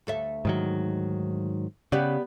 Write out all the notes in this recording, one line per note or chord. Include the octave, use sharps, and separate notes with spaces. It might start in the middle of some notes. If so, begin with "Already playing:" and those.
D2 A4 E5
G#2 D#3 F#3
C#3 B3 G4 D5